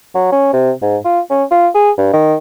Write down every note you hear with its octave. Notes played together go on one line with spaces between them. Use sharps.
F#3
C#4
C3
G#2
F4
C#4
F4
G#4
G2
D#3